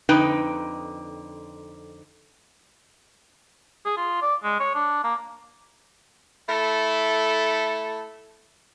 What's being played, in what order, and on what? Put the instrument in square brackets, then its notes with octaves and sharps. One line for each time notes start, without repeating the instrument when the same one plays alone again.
[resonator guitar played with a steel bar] F2 D3 D#4 B4 G5
[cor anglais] G#4
F4
D5
G#3
C#5
D4
A#3
[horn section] A3 E4 A4